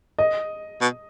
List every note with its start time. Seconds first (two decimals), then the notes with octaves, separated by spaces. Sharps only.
0.19 D#5
0.82 B2